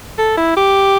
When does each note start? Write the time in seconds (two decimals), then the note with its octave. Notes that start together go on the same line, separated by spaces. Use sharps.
0.18 A4
0.37 E4
0.57 G4